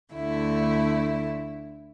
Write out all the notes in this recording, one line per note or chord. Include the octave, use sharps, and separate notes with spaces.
D2 D3 A3 E4 E5